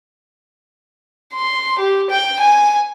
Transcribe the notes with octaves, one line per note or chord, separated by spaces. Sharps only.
C6
G4
G5
G#5